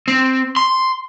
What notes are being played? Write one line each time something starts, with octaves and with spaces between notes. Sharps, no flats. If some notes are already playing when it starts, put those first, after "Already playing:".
C4
C6